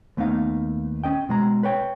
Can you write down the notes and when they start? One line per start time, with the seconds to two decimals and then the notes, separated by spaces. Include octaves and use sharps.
0.17 D#2 A3 B3 D#4 F5
1.04 C#4 D#5 G5
1.29 B2 G#3 A#5
1.63 B4 C#5 G5